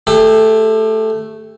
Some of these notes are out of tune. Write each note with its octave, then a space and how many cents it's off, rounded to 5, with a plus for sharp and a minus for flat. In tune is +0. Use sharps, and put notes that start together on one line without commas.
A3 +0 G4 +35